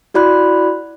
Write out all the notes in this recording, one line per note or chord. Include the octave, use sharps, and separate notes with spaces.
E4 F#4 D5 B5 F#6